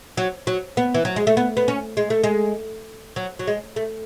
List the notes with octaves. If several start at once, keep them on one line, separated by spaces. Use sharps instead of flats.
F#3
F#3
B3
E3
F#3
G#3
A3
B3
B3
C#4
G#3
A3
G#3
F#3
F#3
G#3
A3